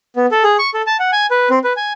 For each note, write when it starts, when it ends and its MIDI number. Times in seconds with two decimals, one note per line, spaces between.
0.16 0.26 59
0.31 0.43 69
0.44 0.57 68
0.59 0.70 85
0.74 0.82 69
0.87 0.97 81
0.99 1.11 78
1.12 1.26 80
1.31 1.49 71
1.50 1.59 60
1.64 1.73 71
1.77 1.93 80